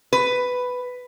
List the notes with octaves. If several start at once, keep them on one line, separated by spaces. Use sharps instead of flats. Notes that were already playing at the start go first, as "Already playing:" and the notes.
B4